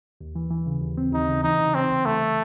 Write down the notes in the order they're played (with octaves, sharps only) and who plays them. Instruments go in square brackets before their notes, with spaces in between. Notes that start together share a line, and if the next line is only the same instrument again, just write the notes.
[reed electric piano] D#2
E3
E3
C#3
D#2
C4
[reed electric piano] D#2 [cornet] D#4
[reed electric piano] C#3
[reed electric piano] E3 [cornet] D#4
[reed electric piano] C3
[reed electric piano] C3 [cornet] C4
[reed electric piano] C2
[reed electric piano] C2 [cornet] A3